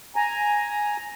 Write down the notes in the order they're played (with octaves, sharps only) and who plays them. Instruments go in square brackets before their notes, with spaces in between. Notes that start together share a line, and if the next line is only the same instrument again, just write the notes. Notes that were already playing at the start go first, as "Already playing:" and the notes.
[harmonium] G#5 A#5